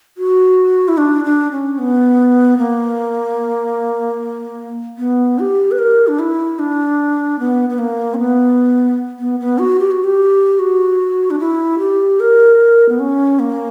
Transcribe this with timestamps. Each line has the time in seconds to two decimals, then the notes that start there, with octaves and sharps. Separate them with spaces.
0.18 F#4
0.88 E4
0.98 D4
1.25 D4
1.51 C#4
1.78 B3
2.58 A#3
4.98 B3
5.39 G4
5.71 B4
5.79 A#4
6.07 D4
6.19 E4
6.59 D4
7.39 B3
7.69 B3
7.79 A#3
8.14 C#4
8.19 B3
9.19 B3
9.40 B3
9.59 F#4
9.79 G4
9.91 F#4
10.04 G4
10.59 F#4
11.30 D4
11.39 E4
11.79 G4
12.20 A#4
12.89 B3
12.99 C#4
13.39 A#3